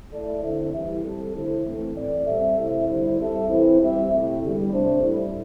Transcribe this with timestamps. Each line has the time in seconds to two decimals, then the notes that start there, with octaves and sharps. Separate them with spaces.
0.12 A3 E4 A4 D5
0.42 D3 C4 E4 C5 E5
0.74 E3 G3 E4 G4
1.04 G3 C4 A4
1.35 D3 A3 E4 A4 C5
1.65 A2 E3 A3 C4
1.96 A2 E3 C4 A4 D5
2.27 G3 C4 A4 E5
2.57 C3 A3 E4 C5 E5
2.88 D3 G3 E4 C5
3.20 G3 C4 A4 E5
3.49 E3 C4 E4 C5
3.81 G3 C4 G4 E5
4.11 C3 A3 C4 E4 G4
4.42 E2 D3 G3
4.73 C3 A3 D4 C5
5.03 A2 G3 E4